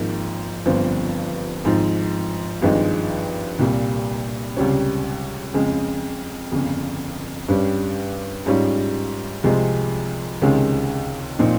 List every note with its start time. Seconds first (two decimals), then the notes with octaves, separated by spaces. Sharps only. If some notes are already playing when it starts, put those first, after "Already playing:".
Already playing: G#1 G#2 F3 A#3
0.66 G1 G2 F3 C4
1.64 G#1 G#2 F3
2.62 G#1 G2 F3 G#3 D#4
3.59 C2 A#2 G3
4.57 C#2 C3 G3 C#4
5.54 F2 C#3 G#3
6.51 G1 F2 C#3
7.49 G2 G3 C#4
8.46 G#2 G3 C#4 F4
9.44 C2 C3 F3 G#3
10.42 C#2 C3 D#3 G#3 C#4
11.39 A#2 F3 C4 D#4